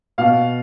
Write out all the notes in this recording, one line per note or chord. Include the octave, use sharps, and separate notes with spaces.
B2 F5